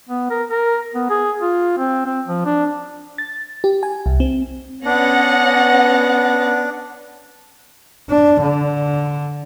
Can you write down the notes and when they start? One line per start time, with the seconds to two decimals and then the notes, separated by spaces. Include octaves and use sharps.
0.09 B3
0.30 A#4
0.50 A#4
0.94 B3
1.10 G#4
1.41 F4
1.78 C4
2.06 C4
2.27 F3
2.45 D4
3.18 A6
3.64 G4
3.83 G#5
4.06 C2
4.20 C4
4.85 B3 C#4 D4 F#5 A#6
8.09 D4
8.42 D3